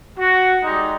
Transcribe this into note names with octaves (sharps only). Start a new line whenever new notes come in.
F#4
G3 G#3 D#4